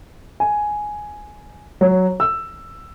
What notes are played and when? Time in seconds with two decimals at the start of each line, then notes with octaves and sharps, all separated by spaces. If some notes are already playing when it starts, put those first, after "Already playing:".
0.40 G#5
1.81 F#3
2.20 E6